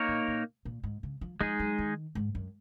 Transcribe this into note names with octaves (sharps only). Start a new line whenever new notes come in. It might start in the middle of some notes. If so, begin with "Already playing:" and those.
Already playing: A#3 D#4 A#4 C#5
A#2
A#2
A#2
G#2
C#3
F3
F3 G#3 D#4 G#4
F#3
D#3
G#2
F#2